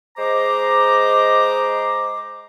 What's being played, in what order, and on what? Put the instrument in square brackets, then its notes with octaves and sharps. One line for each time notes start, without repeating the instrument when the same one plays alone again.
[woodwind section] G#3 C5 D#5 A#5 D6